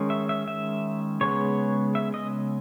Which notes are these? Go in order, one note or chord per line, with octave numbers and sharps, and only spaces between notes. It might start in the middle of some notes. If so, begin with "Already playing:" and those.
Already playing: D#3 G#3 C#4
E5
E5
E5
C#3 G#3 B3 C#5
E5
D#5